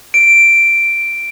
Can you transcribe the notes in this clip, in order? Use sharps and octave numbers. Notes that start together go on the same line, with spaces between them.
D7